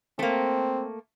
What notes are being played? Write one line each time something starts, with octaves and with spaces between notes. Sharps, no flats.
A3 A#3 C4